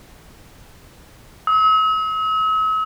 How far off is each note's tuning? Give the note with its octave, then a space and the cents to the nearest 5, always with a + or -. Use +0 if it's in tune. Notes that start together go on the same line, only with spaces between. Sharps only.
E6 -45